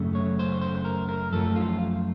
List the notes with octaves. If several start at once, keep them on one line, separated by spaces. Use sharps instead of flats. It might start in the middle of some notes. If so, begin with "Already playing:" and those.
Already playing: F#2 C#3 A3
C#5
C5
C5
A#4
A#4
F#2 F3 A3 A4
F4